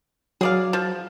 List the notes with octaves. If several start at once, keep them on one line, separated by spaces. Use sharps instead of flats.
F#3 G#4 D5 F5
F3